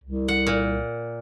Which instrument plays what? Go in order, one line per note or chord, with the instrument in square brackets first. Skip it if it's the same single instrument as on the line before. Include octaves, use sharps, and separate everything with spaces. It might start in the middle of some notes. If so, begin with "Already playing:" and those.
[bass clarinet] C2
[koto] F#5
A#2